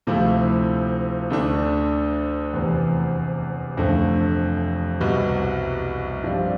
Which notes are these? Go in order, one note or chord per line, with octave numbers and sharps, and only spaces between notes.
D2 C3 F3 A3 E4
D2 D3 A3 D4
F1 E2 C3 E3
F1 F2 D3 A3
C2 B2 G3
G2 F3 C4 G4 D5